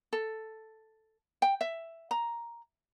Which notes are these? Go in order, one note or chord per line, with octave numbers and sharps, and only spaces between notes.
A4
G5
E5
A#5